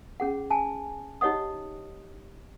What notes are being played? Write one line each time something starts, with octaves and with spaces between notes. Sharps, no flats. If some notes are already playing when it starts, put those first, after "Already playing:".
C#4 G#4 F#5
G#5 A5
D#4 G4 C#5 D#5 F#5 D#6